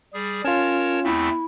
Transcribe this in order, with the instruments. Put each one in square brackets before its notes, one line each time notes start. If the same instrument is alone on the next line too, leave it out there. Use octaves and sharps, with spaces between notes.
[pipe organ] G3 G#4
[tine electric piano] C#4 F4 [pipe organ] A#4 C#5 A5
[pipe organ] E2 A3 C4 [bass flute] E4